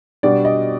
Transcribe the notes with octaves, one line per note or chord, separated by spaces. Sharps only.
B2 G3 B3 D4 D5
D#5